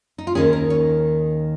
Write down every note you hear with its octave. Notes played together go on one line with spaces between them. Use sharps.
D#4
F4
D#2 D#3 C#4 G#4
A#4
C#5